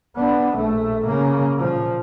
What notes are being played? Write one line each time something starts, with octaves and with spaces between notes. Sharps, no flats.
B3 D4
A#1 A3
C#3 A#3
A#2 F3